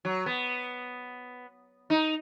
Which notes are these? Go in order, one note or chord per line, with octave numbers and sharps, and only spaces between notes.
F#3
B3
D#4